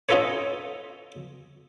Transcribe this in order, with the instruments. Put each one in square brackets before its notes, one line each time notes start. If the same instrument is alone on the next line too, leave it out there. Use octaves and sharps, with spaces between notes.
[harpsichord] C#4 D#4 F4 A4 B4 C#5